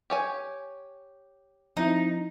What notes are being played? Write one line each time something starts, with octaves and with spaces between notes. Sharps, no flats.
G4 C#5 G#5
F3 C4 D#4 E4